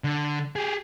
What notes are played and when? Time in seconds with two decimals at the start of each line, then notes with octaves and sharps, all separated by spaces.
0.04 D3
0.56 G4 G#4